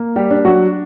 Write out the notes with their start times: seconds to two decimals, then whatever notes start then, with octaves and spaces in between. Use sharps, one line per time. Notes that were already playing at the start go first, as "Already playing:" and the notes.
Already playing: A#3
0.16 G3 G4
0.31 D4
0.45 F#3 F#4